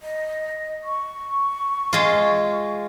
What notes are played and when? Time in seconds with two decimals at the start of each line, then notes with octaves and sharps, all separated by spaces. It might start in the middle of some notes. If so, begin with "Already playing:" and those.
0.02 D#5
0.84 C#6
1.93 G#3 F4